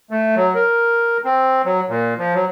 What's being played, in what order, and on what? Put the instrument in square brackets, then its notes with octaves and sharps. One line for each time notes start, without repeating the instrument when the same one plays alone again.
[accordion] A3
F#3
A#4
C4
F#3
A#2
F3
F#3